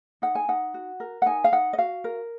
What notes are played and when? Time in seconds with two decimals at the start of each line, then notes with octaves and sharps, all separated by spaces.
0.22 D#4 F#5
0.35 G#5
0.48 D#4 F#5
0.74 F#4
1.00 A#4
1.22 F#5
1.26 D#4 G#5
1.44 F5
1.52 D#4 F#5
1.73 D#5
1.78 F#4 F5
2.04 A#4